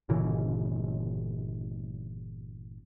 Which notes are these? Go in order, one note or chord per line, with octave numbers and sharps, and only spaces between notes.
G1 A#2 C#3 E3